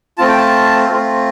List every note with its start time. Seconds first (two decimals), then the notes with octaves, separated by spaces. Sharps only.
0.18 A3 C4 F4 A5
0.28 G5
0.38 A5
0.90 A3 C4 F4